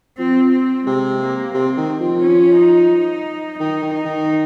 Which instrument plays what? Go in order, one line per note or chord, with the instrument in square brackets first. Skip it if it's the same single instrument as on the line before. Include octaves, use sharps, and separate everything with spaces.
[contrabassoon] F3 [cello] C4
[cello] C4
[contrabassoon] C3 [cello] G#3
[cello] A#3
[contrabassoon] C3 [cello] C4
[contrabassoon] D#3
F3
[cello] C#4
D#4
[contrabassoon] D#3 [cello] D#4
[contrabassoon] D#3
[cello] D#4
[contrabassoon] D#3